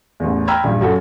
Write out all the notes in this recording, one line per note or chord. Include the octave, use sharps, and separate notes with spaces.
A1 E2
G5 A#5 B5 E6 F6 G#6
A#1 G2
F#2 F#4 A4